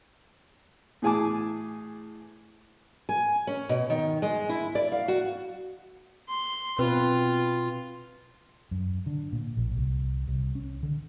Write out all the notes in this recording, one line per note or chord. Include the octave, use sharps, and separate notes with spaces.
A2 E3 G#4 G#5 A5 D6
G#5
C#4
B2
D#3
G#3
E4
D5
F5
F#4
C6
B2 C4 F4 B4
F#2
D3
A#2
A#1
C2
C2
C#4
D3